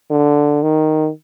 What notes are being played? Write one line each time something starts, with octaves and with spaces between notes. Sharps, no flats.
D3
D#3